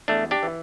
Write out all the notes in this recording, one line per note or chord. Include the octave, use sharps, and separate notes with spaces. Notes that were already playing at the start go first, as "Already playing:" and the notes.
E2 A3 D4
D4 G4
E3